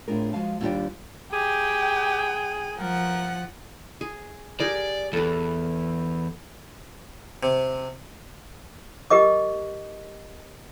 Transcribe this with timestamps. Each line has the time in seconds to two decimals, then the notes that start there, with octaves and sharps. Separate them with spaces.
0.08 A2 C4 D4 F4 G#4 A#4
0.33 F3 G#3 F#4 F5 A5
0.61 D#2 G3 D4 F4 G4 D5
1.33 G4 G#4 G5
2.78 F3 A#4 F#5
4.01 G#4
4.60 G4 G#4 A#4 D5
5.13 E2 A4 B4
7.43 C3
9.10 G4 A#4 D#5 D6